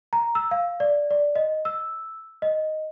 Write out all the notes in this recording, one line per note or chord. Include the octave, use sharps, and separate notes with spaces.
A#5
E6
F5
D5
D5
D#5
E6
D#5